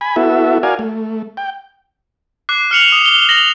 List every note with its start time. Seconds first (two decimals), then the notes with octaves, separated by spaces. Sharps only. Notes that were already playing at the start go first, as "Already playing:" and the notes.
0.01 G#5 B5
0.16 B3 E4 F#4 A4 E5
0.63 F#4 A#4 D5 F5 G#5
0.79 A3
1.37 G5
2.49 D6 F#6 C7
2.71 F6 C#7 F7 F#7
2.92 D#6
3.06 G7
3.29 A#6 F7 F#7